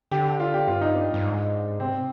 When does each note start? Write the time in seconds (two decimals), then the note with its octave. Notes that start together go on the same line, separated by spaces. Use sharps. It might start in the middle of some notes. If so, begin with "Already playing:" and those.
0.11 D3 G4
0.40 F4
0.54 G4
0.68 G2 F4
0.81 D#4
0.95 D4
1.14 G2
1.24 G#2
1.79 C3 C4